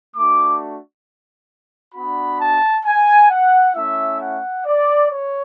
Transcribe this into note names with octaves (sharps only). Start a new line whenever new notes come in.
A3 D4 F#4 D6
B3 D4 F#4 B5
A5
G#5
F#5
A3 C#4 E4 E5
F#5
D5
C#5